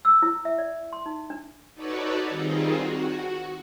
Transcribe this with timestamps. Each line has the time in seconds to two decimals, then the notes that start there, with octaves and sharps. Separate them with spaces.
0.05 E6
0.22 E4
0.45 E5
0.58 D5
0.93 C6
1.06 D#4
1.30 D4
1.75 D#4 F#4 A4 B4 C#5 D5
2.29 D#3 G3 C4 D#4 F4 G#4
2.72 F#4